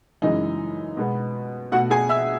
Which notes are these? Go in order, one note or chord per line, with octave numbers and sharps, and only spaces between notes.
F#2 C#3 E3 G#3 D#4 D#5
B2 G#3 B3
B2 A3 F#4 F#5
G#4 G#5
E5 E6